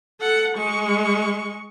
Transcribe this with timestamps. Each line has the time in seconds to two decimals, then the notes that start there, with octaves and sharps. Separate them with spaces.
0.20 A4 F#5
0.56 G#3 C#6